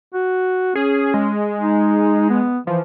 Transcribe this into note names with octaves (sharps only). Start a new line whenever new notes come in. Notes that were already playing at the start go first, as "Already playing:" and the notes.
F#4
C#4 G#4
G#3
D#4
B3
E3 F3